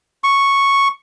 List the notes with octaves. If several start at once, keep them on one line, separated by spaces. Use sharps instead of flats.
C#6